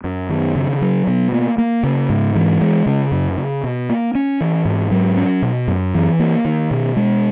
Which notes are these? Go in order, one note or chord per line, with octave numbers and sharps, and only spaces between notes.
F#2
D#3
C#3
F#3
B2
A#3
A#3
C#3
G#2
E3
G#3
C#3
F#2
C#3
B2
A#3
C#4
E3
G#2
F#3
C#4
B2
F#2
E3
A#3
D#3
B2
G#3